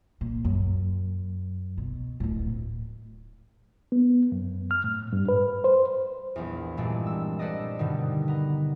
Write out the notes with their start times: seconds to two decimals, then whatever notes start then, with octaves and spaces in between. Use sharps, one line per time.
0.21 A#2
0.45 F#2
1.78 B2
2.20 D1 A2
3.92 B3
4.32 F#2
4.71 F6
4.84 A2
5.13 G2
5.29 B4
5.64 C5
6.36 A#1 E2
6.77 G2 A#2 E3 G#3 C4 D4
7.07 E6
7.39 A4 B4 C5 D5 D#5
7.79 G2 B2 D3 D#3
8.28 B3 A#5